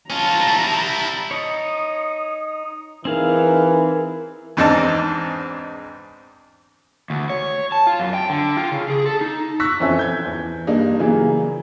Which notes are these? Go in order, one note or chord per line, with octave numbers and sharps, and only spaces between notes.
C#4 F4 A5 A#5
G3 E4
D#4 C#5 D#6
E3 C4 D#4 G#4 A#4 F5
E2 G#2 C4 D4 D#4 A5
D2
C#5
A5
F4
F#2
G5
D3
F4
C#3
G#4
A4
D#4
C#6 E6 F#6 A#6 B6
F2 E3 C4 C#4 A4 E5
G6 G#6
E2
G2 G3 A#3 D4 D#4
C#3 E3 F#3 A#3